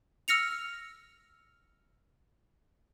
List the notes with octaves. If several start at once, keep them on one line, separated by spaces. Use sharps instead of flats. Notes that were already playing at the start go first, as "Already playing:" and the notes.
E6 F6 A#6 C#7 F7